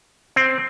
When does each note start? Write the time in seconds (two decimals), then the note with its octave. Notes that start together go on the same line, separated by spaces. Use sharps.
0.36 C4